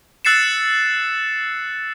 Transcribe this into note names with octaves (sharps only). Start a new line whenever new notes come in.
E6 F#6 A6 C7 C#7 E7